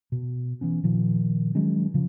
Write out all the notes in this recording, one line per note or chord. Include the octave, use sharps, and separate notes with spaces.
B2
E3 B3 C#4
A#2 D#3 F3
D#3 F#3 G#3 C#4
C#3 F3